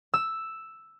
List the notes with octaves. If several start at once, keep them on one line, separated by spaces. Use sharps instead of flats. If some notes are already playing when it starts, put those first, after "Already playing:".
E6